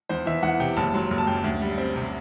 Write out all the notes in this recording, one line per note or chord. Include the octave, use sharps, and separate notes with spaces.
E2 C5
E3 E5
E2 F#5
C3 G5
F#1 A5
F#3 C6
F#1
A5
F#2 G5
D2
G3
C4
C3